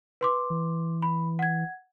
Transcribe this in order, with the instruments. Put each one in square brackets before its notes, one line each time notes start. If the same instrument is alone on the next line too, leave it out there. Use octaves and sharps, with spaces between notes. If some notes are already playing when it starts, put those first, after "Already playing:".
[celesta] B4 C6 D6
[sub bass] E3
[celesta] B5
F#5 G#6